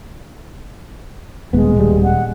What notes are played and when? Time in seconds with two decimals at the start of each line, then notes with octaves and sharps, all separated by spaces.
1.53 D#1 G#3 B3
1.76 D#1 G3
2.03 F#5